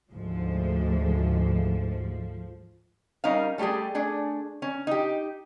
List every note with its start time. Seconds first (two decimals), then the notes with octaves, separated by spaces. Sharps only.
0.12 D2 G#2 F3
3.24 G3 C#4 D#4 A#4 F5
3.58 G3 A3 C#4 G4 G#4
3.95 A3 D4 G#4
4.62 C#4
4.87 D#4 G4